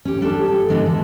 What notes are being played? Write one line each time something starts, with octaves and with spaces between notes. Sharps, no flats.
C#4 G4
G3 D4 G4 A4
A4
D3 E3 F#3 G#3 B3 D4
E2 A4